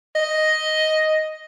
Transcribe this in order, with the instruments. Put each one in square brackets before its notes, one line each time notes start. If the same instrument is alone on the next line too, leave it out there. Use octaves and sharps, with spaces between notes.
[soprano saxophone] D#5